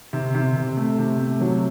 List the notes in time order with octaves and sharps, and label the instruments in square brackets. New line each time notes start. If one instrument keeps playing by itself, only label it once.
[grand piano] C3
C3
C3
A3
C3
A3
F#3